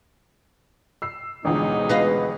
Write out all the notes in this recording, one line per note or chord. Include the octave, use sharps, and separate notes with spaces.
E6 C7
A1 D2 B2 F3 G#3 D#4
B4 D#5 F5